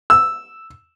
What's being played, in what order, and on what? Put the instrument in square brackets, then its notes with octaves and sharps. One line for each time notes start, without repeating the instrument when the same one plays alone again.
[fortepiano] E6